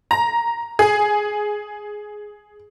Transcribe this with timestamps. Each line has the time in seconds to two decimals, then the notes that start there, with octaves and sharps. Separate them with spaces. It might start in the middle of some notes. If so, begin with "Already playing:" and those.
0.11 A#5
0.79 G#4